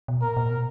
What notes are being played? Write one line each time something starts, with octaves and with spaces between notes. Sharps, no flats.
B2
A#2 A#4
A#2
B2